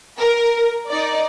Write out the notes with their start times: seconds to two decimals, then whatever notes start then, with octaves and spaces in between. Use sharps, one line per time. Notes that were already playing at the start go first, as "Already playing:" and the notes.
0.18 A#4
0.87 D#4 D5